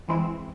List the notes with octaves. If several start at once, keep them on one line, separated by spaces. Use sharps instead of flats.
E3 G#3 C4 E4